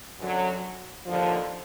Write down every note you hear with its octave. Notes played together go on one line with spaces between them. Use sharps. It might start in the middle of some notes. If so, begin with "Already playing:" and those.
F#2 D3 F#3
D#2 D3 F3